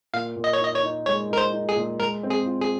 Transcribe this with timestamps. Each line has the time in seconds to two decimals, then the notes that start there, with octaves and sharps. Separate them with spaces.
0.13 A#2 F5
0.36 A#2
0.44 D#5
0.53 C#5
0.60 D#4 D#5
0.75 C#5
0.83 D#4
1.06 G#3 C#5
1.30 D#4 A#4
1.38 C5
1.53 D#4
1.69 G#4
1.76 A#2
1.99 G#3 A#4
2.23 C4
2.30 G#4
2.46 F4
2.61 G#4